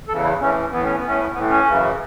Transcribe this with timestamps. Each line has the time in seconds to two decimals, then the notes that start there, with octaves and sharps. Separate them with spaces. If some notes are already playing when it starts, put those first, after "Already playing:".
0.08 E2 C#3 E3 A4
0.24 E4
0.39 A2 E3 C#4
0.71 A2 E3 B3
0.84 C#4
0.97 B3
1.03 A2 E3 C#4
1.21 B3
1.34 A2 E3 B3
1.50 C#4
1.66 F#2 C#3 E3